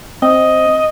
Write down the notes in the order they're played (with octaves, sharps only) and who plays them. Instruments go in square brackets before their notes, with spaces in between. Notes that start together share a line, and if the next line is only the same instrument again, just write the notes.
[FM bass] C4 [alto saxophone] D#5